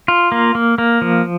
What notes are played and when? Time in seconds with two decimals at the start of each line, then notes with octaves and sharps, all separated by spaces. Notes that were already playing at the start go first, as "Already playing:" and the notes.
0.08 F4
0.32 A#3
0.55 A#3
0.78 A#3
1.02 F3